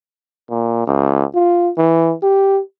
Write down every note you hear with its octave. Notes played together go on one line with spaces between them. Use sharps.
A#2
C#2
F4
E3
G4